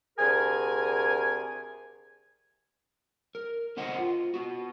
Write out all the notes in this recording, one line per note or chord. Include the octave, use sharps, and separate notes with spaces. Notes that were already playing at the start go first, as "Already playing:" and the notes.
D2 C3 G#4 A#4 G#5
A#4
D3 B3 C5 D#5 F#5
F4
B3 F#4